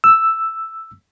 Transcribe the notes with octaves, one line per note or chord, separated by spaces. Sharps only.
E6